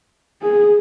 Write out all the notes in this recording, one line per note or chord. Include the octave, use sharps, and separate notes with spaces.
G#4